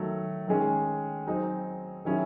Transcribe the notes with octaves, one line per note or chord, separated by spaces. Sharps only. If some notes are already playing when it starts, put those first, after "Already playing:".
Already playing: D#3 F#3 A3
D#3 G#3 C#4 G#4
F#3 C4 D#4 G#4
D#3 F#3 C#4 E4 G#4